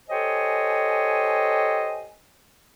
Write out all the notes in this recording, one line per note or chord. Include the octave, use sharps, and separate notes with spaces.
G4 A4 C5 C#5 D#5 G#5